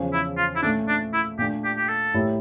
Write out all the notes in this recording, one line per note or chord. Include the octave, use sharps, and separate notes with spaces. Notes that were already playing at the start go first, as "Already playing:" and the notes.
Already playing: E2 C#3 F3 C#4
E4
F4
E4
A#2 A3 C#4 D4
D4
E4
A#2 A3 D4 G4
G4
G4
A4
A2 G3 A#3 E4